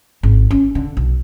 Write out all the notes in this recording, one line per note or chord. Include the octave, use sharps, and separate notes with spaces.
G#1
C#4
D3
B1